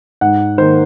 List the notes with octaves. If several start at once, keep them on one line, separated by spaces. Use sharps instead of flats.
G#2 F#5
D#3 A#3 C5